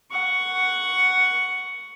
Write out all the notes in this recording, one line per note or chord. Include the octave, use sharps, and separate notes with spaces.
F#5 C#6